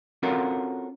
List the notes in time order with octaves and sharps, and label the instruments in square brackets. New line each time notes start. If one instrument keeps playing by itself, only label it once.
[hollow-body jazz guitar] C4 C#4 F4 F#4 A4 A#4